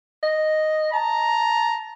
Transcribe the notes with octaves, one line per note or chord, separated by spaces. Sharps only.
D#5
A5 A#5